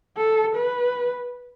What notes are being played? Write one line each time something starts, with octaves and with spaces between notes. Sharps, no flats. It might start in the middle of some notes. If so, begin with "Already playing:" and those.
A4
B4